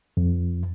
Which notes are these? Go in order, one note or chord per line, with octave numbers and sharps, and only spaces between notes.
F2